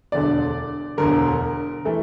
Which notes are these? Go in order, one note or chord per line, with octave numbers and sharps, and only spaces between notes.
E1 D2 D3 D5
E1 D2 D3 A#4
E3 A3